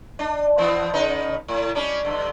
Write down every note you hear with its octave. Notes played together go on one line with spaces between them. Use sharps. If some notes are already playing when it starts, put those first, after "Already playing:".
D4
E3 B3 C4
C#3 D#4 B4
A2
G3 C#4 D4
G2 D3